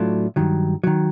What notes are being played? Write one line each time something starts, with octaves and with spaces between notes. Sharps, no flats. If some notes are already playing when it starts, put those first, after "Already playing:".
Already playing: A2 F#3 A3 D4 F4
G2 D#3 F#3
D#3 F#3